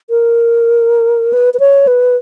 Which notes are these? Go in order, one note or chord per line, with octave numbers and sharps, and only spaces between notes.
A#4
B4
B4
C#5
B4